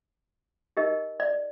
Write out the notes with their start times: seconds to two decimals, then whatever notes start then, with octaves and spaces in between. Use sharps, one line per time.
0.77 D#4 G4 A#4 D#5
1.20 D5